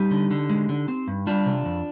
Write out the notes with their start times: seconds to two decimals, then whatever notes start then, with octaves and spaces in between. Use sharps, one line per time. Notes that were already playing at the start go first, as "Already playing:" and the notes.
Already playing: G3 D#4 G4
0.11 D3
0.31 D3
0.49 G#3
0.69 D3
0.88 C4
1.07 G2
1.27 G3 D4 F4
1.46 C3
1.65 F2